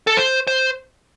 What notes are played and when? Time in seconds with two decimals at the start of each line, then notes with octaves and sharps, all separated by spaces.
0.07 A4
0.17 C5
0.47 C5